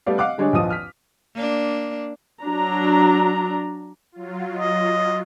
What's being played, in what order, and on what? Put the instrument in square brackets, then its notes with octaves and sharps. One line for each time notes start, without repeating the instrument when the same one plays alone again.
[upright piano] G3 A3 B3 D5 F5
D#5 F5 F#5 D6 F#6
D3 G3 G#3 D4 G#4 C#5
A#1 E2 F3 D#5 D#6 D#7
F6 B6
[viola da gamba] A#3 D4
[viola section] F#3 D4 A#5
[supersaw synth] F#3 F4
[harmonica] D#5